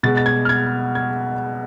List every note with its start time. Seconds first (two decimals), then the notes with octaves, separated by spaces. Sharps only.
0.03 B2 G#3 A6
0.17 A6
0.26 G#6
0.45 F6
0.49 G#6
0.95 G#6